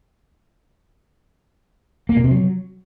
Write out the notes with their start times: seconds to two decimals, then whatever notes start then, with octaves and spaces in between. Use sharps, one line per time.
2.09 A#3
2.17 B2
2.24 C3
2.31 F#3